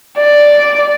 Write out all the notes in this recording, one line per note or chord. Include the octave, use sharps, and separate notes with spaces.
D5